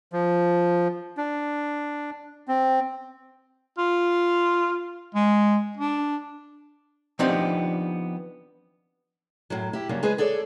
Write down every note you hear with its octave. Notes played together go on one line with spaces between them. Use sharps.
F3
D4
C4
F4
G#3
D4
F3 B3 C4 D4 D#4 G4
F#2 A2 F#3
E4 G4
G2 C#3 F#3 G3 A#3
G#3 G#4 B4 C5
G#4 A4 C#5 D5